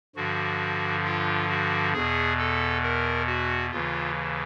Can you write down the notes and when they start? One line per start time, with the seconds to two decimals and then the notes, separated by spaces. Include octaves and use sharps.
0.16 G2 D3 F3 F#4
1.05 F4
1.49 F#4
1.93 E2 B2 G#4
2.38 A4
2.83 A#4
3.27 F#4
3.71 D#2 C#3 E3 F4